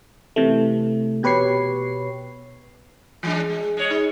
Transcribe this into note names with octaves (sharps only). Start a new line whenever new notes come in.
C3 E3 A3
B2 G4 B4 C#5 C#6 C7
E3 G#3 D4
G#3
G#3 C#5
D#4